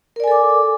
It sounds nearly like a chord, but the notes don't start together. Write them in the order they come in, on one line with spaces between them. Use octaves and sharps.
A#4 D5 G#5 A4 D6